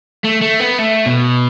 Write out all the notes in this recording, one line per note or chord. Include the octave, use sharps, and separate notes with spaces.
A3
A3
B3
A3
B2